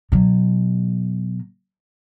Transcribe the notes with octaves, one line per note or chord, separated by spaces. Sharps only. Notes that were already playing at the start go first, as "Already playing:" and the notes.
B2 F#3